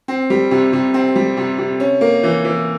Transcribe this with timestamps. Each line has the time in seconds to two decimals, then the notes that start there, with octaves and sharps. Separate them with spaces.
0.08 C4
0.30 G3
0.51 C3
0.73 C3
0.94 C4
1.16 G3
1.37 C3
1.59 C3
1.80 C#4
2.01 A#3
2.23 E3
2.45 E3